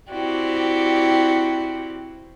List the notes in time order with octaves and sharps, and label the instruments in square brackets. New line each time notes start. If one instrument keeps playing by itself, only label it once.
[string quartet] C4 E4 F#4 G4 D5